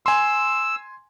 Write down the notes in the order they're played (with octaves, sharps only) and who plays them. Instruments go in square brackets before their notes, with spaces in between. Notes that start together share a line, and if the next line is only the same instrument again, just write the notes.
[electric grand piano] G#5 C6 [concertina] E6